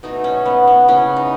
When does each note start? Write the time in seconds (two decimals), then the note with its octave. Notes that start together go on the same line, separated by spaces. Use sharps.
0.03 B2 A3 D#4
0.24 C#4
0.46 B3
0.67 B3
0.88 C#3 E3 B3 C#4
1.16 D#4